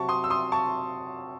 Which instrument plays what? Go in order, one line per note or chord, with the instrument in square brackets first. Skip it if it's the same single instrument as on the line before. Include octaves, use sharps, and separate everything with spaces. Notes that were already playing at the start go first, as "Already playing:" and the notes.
Already playing: [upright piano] C3 F#3 A5 C#6
C6 D#6
E6
C6 D#6
A5 C#6